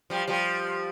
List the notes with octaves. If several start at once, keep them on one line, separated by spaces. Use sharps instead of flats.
F3 G3
F3 G3